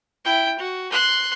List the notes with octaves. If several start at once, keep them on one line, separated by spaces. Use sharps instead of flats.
E4 G5
F#4
C6 F#6